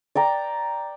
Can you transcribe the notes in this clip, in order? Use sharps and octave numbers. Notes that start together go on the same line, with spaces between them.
D5 G5 A#5